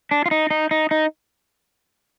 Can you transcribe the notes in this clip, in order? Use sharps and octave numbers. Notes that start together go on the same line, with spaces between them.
D4
F4
D#4
D#4
D#4
D#4